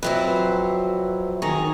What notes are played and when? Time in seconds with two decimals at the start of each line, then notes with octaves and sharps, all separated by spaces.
0.03 F2 F#3 B4 C5 E5
1.42 D#3 G#4 A#5 C#6